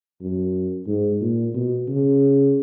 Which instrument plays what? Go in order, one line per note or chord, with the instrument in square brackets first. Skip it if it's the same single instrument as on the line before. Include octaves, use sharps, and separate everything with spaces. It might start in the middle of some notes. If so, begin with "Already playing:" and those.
[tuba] F#2
G#2
A#2
B2
C#3